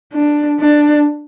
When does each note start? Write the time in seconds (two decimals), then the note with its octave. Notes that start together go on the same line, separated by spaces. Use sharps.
0.14 D4
0.60 D4